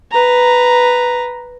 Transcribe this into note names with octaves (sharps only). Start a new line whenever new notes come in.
B4 A#5